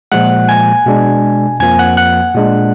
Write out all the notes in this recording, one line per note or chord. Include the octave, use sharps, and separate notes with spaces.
A#2 F3 G#3 F#5 F#6
G#5 G#6
B2 G#3 D4
F2 F3 A#3 G#5 G#6
F#5 F#6
F#5 F#6
A#2 G#3 D4